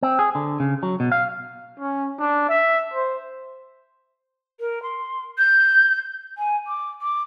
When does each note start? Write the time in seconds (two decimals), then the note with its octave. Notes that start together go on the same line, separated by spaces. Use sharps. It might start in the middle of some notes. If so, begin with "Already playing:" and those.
0.03 C4
0.19 G#4
0.35 D3
0.60 C#3
0.83 F#3
1.00 B2
1.12 F5
1.80 C#4
2.19 D4
2.49 E5
2.94 C5
4.60 A#4
4.83 C6
5.38 G6
6.38 G#5
6.67 D6
7.02 D6